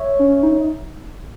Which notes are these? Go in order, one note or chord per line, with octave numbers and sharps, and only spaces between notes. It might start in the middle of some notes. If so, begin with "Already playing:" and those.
Already playing: C#5 E5
C#4
D#4